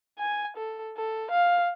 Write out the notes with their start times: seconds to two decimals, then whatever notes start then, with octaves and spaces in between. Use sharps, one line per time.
0.18 G#5
0.56 A4
0.97 A4
1.30 F5